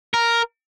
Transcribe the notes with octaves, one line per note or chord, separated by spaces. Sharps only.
A#4